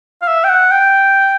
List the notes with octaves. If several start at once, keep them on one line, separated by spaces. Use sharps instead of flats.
F5
E5
G5
F#5
G5